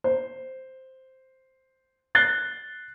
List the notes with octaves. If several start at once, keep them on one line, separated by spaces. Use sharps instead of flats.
C5
F#6 A6 C7 G7